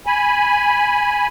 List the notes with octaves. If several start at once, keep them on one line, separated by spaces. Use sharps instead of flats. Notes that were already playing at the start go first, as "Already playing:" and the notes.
G#5 B5